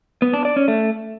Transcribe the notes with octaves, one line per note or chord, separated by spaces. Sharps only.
B3
D4
D5
C#4
A3